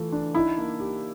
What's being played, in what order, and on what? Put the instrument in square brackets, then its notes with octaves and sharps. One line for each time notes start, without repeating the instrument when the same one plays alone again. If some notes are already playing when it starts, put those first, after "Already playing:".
Already playing: [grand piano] E3 A3 F4
D4
[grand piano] D#4 [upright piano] E4
[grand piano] A#3
G4